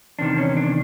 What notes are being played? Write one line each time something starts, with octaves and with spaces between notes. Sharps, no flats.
E2 C3 D#3 D4
C#4
D4